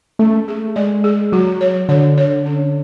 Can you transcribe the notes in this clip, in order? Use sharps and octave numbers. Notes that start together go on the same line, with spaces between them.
A3 C#4
G#4
G#3 D5
G#4
F#3 F#4
C#5
D3 C#5
C#5
C#4